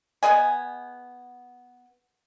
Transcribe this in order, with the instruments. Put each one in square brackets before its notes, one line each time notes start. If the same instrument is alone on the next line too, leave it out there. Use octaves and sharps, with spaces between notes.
[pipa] B3 G#4 D#5 G#5